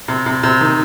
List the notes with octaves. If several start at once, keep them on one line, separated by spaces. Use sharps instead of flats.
C3
C3
C3
D#3